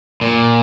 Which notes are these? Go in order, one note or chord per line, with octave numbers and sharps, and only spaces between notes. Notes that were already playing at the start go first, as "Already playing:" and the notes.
A#2